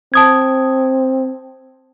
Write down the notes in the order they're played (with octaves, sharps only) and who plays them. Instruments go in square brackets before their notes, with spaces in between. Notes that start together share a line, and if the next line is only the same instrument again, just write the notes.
[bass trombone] C4 [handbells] A5 D#6 G#6